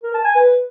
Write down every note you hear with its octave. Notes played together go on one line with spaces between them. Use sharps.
A#4
A5
G#5
B4